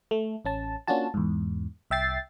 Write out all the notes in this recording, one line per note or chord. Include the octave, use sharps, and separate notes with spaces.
A3
A1 C#4 A5
A#3 C#4 D4 F4 F#4 A5
E2 G#2
C2 E5 G5 A6 C7